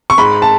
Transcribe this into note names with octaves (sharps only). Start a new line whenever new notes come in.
C#6
G#2 B5
A5